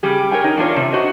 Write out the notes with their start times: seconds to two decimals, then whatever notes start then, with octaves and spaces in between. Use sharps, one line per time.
0.03 C#3 G3 G4 G#4
0.31 A#4 C#5 G5 G#5
0.44 D#4 A#4
0.57 E2 G3 D4 D#4 F4 C#5
0.76 C3
0.92 F#4 C5 D#5